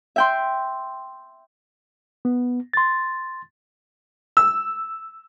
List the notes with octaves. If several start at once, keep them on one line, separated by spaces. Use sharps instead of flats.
E5 G5 C6
B3
C6 A6
E6